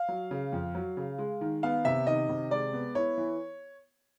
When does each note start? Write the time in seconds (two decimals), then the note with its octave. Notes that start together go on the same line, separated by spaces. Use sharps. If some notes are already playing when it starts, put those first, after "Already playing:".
Already playing: F5
0.08 F#3
0.31 C#3
0.52 F2
0.75 F#3
0.97 C#3
1.18 G#3
1.41 D#3
1.63 B3 F5
1.85 C3 E5
2.07 D#3 D#5
2.29 C3
2.51 G#3 D5
2.73 B3
2.95 E4 C#5
3.18 E3